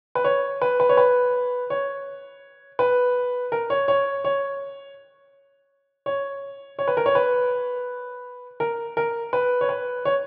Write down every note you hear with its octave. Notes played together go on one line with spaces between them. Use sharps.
B4
C#5
B4
B4
C#5
B4
C#5
B4
A#4
C#5
C#5
C#5
C#5
C#5
B4
A#4
C#5
B4
A#4
A#4
B4
C#5
B4
C#5